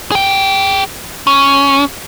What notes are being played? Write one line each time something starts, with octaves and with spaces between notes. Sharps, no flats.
G#4 G5
C#4